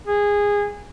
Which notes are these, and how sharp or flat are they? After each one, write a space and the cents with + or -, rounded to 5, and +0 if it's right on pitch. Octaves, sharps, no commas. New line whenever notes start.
G#4 -20